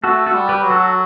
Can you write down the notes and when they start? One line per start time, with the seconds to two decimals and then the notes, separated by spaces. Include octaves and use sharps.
0.04 A3 F#4 A4
0.26 F#4 A4
0.34 G3
0.49 G4 B4
0.63 F#3
0.70 F#4 A4